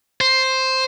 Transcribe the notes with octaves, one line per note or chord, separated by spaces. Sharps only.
C5